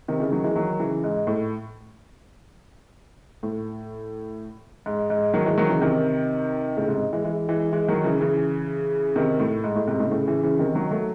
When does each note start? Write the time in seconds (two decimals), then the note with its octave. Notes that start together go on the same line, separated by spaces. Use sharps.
0.08 C3 D#3
0.20 C#3 E3
0.32 D#3 F#3
0.44 E3 G#3
0.56 D#3 F#3
0.80 C#3 E3
1.04 G#2
1.27 A2
3.43 A2
4.86 G#2
5.10 G#2
5.34 D#3 F#3
5.46 E3 G#3
5.58 D#3 F#3
5.69 C#3 E3
5.81 C3 D#3
6.77 A2 C#3
6.89 G#2 C3
7.13 E3 G#3
7.25 E3 G#3
7.49 E3 G#3
7.72 E3 G#3
7.88 D#3 F#3
8.04 C#3 E3
8.21 C#3 E3
9.16 C3 D#3
9.40 A2
9.64 G#2
9.75 A2
9.88 G#2 C3
10.00 A2 C#3
10.11 A2 C#3
10.28 C#3 E3
10.43 C#3 E3
10.59 C3 D#3
10.75 D#3 F#3
10.91 F#3 A3